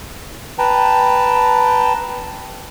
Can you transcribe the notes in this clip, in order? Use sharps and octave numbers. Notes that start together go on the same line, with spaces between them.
B4 G5 A5 A#5